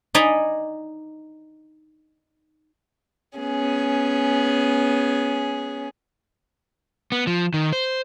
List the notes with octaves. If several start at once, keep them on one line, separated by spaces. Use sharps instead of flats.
D#4 D5 D#5 G#5 A#5 B5
B3 C#4 G#4
B3
F3
D#3
C5